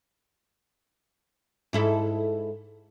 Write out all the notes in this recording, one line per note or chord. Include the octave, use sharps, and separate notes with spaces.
G#2 E4 A4